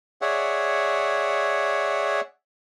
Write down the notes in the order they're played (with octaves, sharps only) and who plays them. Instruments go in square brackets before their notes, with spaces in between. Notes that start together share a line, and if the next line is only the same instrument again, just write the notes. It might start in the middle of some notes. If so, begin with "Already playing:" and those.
[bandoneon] G#4 C#5 D5 E5 F#5